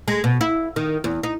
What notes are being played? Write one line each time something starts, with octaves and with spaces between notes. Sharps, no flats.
G#3
B2
E4
D#3
E2
D#4